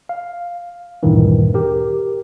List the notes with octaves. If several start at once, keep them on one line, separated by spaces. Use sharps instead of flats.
F5
D2 G2 A#2 D#3 E3
G4 A#4